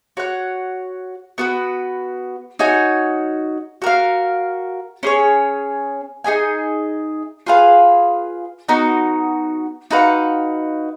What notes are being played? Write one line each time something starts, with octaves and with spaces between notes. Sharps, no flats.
F#4 C#5 F#5
B3 F#4 B4
D#4 F#4 C#5 G#5
F#4 A#4 F5
C#4 G#4 C#5
D#4 G#4 D#5 G#5
F4 G#4 B4 F5
B3 D#4 F#4
D#4 F#4 B4 F5